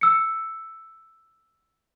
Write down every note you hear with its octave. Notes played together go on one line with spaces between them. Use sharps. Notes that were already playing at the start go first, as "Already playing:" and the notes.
E6 C#7